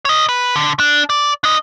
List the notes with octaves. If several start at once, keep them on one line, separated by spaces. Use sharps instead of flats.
C#5 D#5
B4
D3
D4
D5
D4 D#5